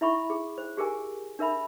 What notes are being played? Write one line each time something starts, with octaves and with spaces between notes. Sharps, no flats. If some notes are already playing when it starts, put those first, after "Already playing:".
E4 E5 B5 C#6
G#4
C5
G4 G#4 A#4 G#5
D4 A#4 E5 B5